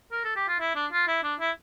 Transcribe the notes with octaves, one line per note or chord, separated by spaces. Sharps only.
A#4
A4
G4
F4
E4
D4
F4
E4
D4
E4